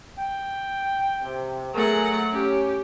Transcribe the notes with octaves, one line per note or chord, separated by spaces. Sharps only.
G5
C3
F#3 A3 G#4 A#4 F#5
C#4 G4